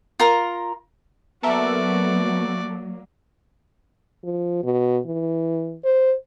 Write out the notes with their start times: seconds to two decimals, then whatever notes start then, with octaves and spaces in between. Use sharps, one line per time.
0.19 F4 A#4 A#5
1.43 F#3 A#3 B3 F#4 A4 A#4 D5 E5
4.24 F3
4.64 B2
5.06 E3
5.84 C5